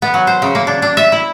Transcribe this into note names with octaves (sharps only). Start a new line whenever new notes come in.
B3
F#3
C5
C#3
A#3
D4
D4
E5
E4